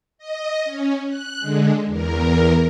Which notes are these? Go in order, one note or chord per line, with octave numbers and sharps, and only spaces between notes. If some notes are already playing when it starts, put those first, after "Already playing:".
D#5
C#4
F#6
D3 G#3
E2 A#4